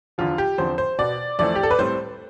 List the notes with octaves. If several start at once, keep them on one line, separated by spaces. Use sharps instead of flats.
E2 D3 F3 F4
G4
E2 D3 F3 C4 C5
C5
B2 B3 D5
F2 E3 A3 C4 D5
G4
A4
B4
A2 G3 C4 C5